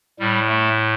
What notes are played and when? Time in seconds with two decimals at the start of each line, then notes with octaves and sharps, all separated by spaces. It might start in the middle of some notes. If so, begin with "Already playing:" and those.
0.19 A2 G3
0.49 A3